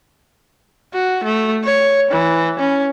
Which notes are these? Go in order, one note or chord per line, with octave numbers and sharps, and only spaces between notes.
F#4
A3
C#5
E3
C#4